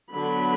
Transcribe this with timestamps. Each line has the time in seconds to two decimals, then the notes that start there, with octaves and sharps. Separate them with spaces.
0.13 D3 F#3 B3 B5